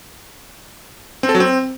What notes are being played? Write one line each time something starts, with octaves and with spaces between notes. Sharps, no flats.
C4
A4
F#3
C4